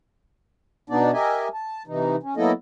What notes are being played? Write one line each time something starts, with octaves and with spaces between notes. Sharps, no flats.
B2 B3 D4 D#4 D5
G4 A#4 D#5 E5 G#5
A5
C3 E3 D#4
C#4
F#3 A#3 B3 E4 A4 D#5